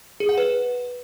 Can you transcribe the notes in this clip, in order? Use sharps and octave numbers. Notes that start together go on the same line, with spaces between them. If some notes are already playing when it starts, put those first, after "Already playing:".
G#4
F#5
B4